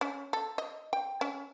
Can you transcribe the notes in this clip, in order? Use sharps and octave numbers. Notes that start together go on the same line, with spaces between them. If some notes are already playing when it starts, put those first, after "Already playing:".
C#4
A4
D#5
G5
C#4